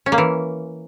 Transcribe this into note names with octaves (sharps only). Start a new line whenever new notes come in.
C#4
A#3
E3